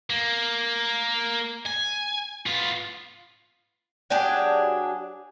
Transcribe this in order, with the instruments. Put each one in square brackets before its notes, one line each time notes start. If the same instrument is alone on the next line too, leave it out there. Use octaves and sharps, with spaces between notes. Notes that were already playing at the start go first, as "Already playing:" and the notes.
[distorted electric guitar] A#3
G#5
B3 F4
[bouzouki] F#3 D4 G4 G#4